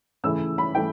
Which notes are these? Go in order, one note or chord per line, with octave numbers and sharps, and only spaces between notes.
C#3 E3 A3 E4 E6
B5
E3 A3 E4 G5